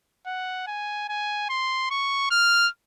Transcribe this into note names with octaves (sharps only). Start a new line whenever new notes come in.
F#5
G#5
G#5
C6
C#6
F6